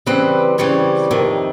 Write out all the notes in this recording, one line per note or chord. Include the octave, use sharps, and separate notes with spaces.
C#3 E3 G3 C4 B4
C#3 E3 G3 C4 C#5
F2 C3 D#3